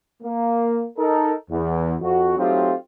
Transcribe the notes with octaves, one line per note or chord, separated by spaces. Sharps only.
A#3
D#4 A4 A#4
E2
F2 F#4
F#3 A3 C4 D#4 F4 G4